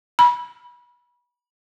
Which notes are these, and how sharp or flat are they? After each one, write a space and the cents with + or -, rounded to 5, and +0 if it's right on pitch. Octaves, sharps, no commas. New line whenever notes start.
B5 -25